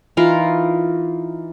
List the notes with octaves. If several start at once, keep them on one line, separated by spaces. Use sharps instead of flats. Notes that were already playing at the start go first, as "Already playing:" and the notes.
E3 D#4 F4 A#4